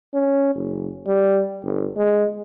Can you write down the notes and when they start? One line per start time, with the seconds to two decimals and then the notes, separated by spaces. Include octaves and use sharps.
0.14 C#4
0.55 F#1
1.07 G3
1.64 G1
1.97 G#3